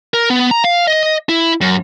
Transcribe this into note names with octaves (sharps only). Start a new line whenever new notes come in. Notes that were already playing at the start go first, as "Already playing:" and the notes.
A#4
B3
A#5
F5
D#5
E4
F#2